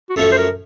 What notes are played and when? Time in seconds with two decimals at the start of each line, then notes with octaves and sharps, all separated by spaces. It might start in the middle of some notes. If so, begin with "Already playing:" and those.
0.10 F#4
0.16 F#2 F3 A3 C#4 A4
0.32 C5
0.38 A#4